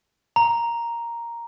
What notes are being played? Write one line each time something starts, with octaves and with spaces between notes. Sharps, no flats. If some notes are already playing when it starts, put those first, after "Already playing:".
A#5